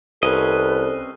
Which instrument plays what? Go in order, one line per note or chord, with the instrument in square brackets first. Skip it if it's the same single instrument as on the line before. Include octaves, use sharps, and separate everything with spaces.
[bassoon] C2 [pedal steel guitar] C4 C#4 D#5 [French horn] A4 [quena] B4